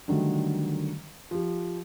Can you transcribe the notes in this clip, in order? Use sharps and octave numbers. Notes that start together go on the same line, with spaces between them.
D3 D#3 F#3 G3 A3
F3 G4